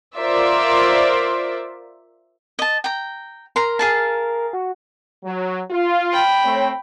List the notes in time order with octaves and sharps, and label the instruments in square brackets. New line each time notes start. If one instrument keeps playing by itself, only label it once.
[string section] F4 A#4 C5 D5 E5
[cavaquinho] D#5 A5
G5 A#5
[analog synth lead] A#4 [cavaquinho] A#5 C6
[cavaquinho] G#4 F5 A5
[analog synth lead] F#4
[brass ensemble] F#3
F4
[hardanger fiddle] G5 B5
[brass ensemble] A3 C4 C#5